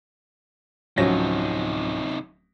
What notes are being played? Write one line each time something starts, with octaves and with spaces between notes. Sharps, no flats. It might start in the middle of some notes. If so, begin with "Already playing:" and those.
D1 C3 F3 F#3 C#4 D#4 F#4 A#6